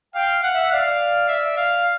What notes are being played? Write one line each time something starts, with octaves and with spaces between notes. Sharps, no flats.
F5 G5
F#5
E5
D5 F5
E5
F5